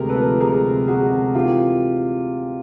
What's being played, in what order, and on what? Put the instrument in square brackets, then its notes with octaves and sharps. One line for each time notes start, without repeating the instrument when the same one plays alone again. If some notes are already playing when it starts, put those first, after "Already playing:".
Already playing: [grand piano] D2 C3 G#3 G4 G#4 A#4
A4 B4
F3
G#3 G#4 A#4
C3
G#3 F#4 G#4
C3
E3 F4 G4